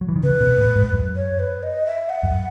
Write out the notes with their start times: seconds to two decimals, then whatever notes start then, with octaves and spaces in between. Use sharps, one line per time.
0.01 F#3
0.09 E3
0.16 D#3
0.23 C#3 B4
0.41 B2
0.58 A2
0.76 G#2
0.93 F#2
1.16 C#5
1.39 B4
1.63 D#5
1.86 E5
2.09 F#5
2.23 F#2